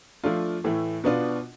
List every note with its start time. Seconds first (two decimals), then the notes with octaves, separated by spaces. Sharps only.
0.24 F3 A3 D4 F4
0.64 A2 E3 A3
1.04 B2 B3 D4 F4